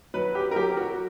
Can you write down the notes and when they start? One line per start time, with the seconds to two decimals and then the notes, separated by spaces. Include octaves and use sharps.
0.14 F#3 B4
0.35 G4
0.51 A#4
0.56 F#3 G4
0.77 F#4